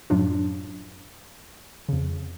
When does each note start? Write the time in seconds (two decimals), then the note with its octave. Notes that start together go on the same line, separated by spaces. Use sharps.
0.10 F#2 A2 F#3 D4 F4
1.89 F2 C#3